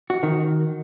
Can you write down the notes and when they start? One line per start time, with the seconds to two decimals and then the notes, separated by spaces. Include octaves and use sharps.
0.10 F#4
0.23 D#3